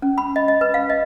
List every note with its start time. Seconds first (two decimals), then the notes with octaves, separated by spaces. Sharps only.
0.02 C#4
0.18 B5
0.36 D#5
0.48 D#5
0.61 B4
0.74 F5
0.90 D#5